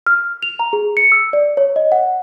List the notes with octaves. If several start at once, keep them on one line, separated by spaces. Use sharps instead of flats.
F6
F7
A#5
G#4
C#7
E6
D5
C#5
D#5
F#5